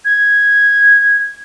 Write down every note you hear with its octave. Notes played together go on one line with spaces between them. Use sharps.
G#6